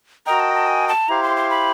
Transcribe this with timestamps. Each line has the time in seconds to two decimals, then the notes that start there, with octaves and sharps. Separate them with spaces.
0.26 F#4 A#4 D#5 G5 A#5
0.40 A5
0.54 A5
0.67 G#5
0.88 A5
1.09 E4 G4 C5 F5 A#5
1.23 C6
1.36 C6
1.50 B5